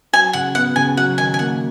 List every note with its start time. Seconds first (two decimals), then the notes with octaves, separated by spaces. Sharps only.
0.13 F#3 G#5
0.33 C#3 F#5
0.55 B3 F#5
0.76 C#3 G#5
0.97 F#3 F#5
1.18 D#3 G#5
1.34 G#5
1.39 A#3 F#5